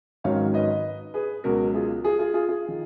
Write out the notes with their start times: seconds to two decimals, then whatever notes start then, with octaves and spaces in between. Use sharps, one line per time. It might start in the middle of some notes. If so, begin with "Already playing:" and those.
0.24 G#1 G#2 D#3 F#3 C#4 C#5 F5
0.54 B4 D#5
1.14 G#4 B4
1.44 C#2 B2 F#3 F#4 A#4
1.74 F4 G#4
2.04 F4 G#4
2.19 F4 G#4
2.34 F4 G#4
2.49 F4 G#4
2.68 D#3